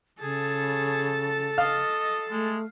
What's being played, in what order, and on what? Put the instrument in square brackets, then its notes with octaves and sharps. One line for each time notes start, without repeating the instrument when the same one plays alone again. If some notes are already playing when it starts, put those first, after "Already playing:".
[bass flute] C#3 [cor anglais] G#4 [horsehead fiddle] A4 A5
[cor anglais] D#5 [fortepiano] F5
[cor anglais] G#3 [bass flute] A3